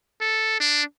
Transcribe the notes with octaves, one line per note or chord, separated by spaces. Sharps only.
A4
D4